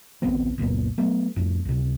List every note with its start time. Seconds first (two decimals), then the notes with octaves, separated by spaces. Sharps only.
0.22 A1 D2 B3 C4
0.58 F#1 C#2 A#2 B3
0.98 F#3 A3 B3
1.36 F2 A2
1.65 C#2 C3